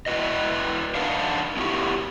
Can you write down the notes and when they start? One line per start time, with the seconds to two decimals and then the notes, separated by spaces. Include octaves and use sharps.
0.06 E4 F#4 B4 D#5
0.95 D4 D#4 A#4 F5 F#5
1.57 B3 E4 F#4 G4